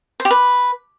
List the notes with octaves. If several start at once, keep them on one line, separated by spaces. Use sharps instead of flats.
C5
G4
B4